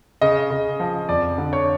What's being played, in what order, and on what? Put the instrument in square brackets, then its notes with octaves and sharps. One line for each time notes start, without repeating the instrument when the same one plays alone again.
[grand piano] C#3 D#5
C#3
F3
F2 D5
D3
C#5